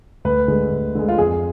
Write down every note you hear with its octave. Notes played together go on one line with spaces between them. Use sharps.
D2 B4
D3 G#3
D2
D3 G#3
F4
F2 G#4